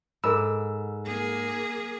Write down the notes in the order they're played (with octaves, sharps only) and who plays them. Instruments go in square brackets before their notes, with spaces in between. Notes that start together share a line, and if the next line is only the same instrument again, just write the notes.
[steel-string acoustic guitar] G#2 [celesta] A4 A#4 B5 [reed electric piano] E6
[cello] A#3 G#4